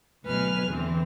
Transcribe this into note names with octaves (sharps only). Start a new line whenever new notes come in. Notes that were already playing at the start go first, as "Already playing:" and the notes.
D2 B2 F#3 B4 G#5 F6
E2 D3 E3 C4